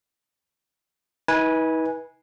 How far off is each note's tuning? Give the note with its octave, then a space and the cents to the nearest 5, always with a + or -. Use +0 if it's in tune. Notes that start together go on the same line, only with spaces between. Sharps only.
D#4 +45 B4 -20 G#5 -5